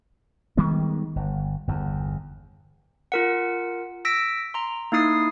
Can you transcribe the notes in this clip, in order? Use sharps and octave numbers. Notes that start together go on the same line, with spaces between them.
D#3 G3 G#3 B3
G1
G1 E2
F4 A#4 F#5
E6 A#6 B6 D7
A#5 C6
A#3 D#4 E4 D#6 C7